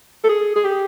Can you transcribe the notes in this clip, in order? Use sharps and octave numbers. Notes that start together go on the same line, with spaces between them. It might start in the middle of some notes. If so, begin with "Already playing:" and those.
A4
G#4
G#4
G4